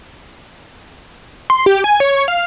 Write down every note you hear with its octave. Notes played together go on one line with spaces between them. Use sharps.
C6
G4
G#5
C#5
F5